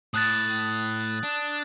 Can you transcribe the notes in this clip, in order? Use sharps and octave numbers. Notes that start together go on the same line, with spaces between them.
A2 D#6 F#6 A6
D4